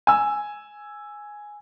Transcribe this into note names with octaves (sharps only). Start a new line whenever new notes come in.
G#5 E6